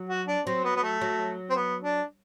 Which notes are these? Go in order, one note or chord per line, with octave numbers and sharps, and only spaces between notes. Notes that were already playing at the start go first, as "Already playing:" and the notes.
Already playing: F#3
F#4
D4
F#3 C4
B3
B3
A3
F#3
C4
B3
D4